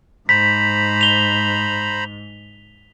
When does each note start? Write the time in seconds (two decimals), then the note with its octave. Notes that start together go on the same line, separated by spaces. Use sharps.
0.29 G#2 C5 A#5 B5 B6
1.01 F7 G7